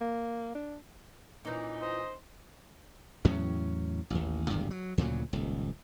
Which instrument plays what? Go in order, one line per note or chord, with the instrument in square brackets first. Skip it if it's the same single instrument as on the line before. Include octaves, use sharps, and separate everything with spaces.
[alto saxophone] A#3
D4
[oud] A#2 E3 [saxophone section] C#4 D#4
[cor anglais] C5 [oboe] D#5
[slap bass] E2 A2 F#3 C#4
A1 D#2
D1 G#1 E2 G2
F#3
D2 A#2 C#3 F#3
D#1 C#2